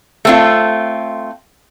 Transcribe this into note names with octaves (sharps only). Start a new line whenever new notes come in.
A3 C4 F4